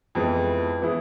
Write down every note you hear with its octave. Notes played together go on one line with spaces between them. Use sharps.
F2 E3 G#3 B3
E3 B3 E4 G#4